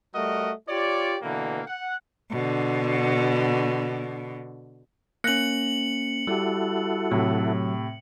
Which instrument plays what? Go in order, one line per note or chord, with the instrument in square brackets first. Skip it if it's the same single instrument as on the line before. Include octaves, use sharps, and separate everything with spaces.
[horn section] G3 A3 F#4 A#4 D#5
F4 G4 C#5 D5
B2 D3 E3 A#3
F#5
[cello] B2 D3
[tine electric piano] A#3 C#4 [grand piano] F#6 A#6 [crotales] C#7 F#7
[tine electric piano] G3 G4 [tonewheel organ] E4 F#4 A4
[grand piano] A2 C3 [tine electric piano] F#3